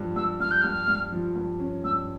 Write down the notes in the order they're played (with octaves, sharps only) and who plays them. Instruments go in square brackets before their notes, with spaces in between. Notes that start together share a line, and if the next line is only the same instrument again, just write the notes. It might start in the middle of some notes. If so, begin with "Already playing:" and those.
Already playing: [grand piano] G2 F3
[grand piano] G2 [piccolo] E6
[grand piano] G2 [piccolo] F6
[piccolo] G6
[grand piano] G2 [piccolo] F6
[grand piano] G2
F3
G2
C#4
[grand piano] G2 [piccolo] E6